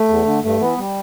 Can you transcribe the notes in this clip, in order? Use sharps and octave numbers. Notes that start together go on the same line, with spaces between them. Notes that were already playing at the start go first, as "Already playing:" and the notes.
Already playing: A3
E2
D3
G2 A3
E3 B3
G3